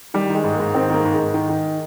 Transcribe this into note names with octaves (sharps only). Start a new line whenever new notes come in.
D#3 G3
D#3
G#3
G#2
A#3
G#2
D#3 C4
D#3 A#3
G#2
G#3
G#2
D#3
D#3